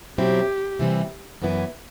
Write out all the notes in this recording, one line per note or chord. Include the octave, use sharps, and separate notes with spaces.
B2 F#3 C4 E4 G4
C3 E3 G3 C4
F#2 E3 B3 E4